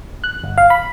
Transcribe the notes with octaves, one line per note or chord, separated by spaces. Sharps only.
F#6
G1
F5
B5